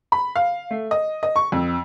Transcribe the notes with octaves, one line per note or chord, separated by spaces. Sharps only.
B5
F5
A3
D#5
D#5
C#6
F2